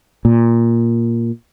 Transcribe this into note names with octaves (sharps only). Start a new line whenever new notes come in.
A#2